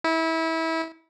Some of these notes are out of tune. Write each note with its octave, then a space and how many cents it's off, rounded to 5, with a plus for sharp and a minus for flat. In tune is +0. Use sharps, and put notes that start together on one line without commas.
E4 -25